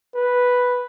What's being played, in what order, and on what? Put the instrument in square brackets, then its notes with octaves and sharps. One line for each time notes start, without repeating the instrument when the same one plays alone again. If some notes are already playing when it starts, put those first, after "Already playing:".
[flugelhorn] B4